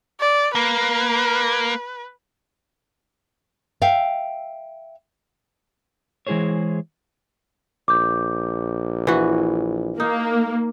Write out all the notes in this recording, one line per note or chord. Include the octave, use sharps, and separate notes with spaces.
D5
A#3 B4
E5 F5 G5
E3 G#3 E4 G#4 C5 C#5
A#1 D6 G6
E3 F#4
A#3 D#4